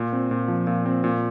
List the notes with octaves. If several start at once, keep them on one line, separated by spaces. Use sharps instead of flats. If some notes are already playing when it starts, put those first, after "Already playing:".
Already playing: A#2
C4
A#2
F3
A#2
C4
A#2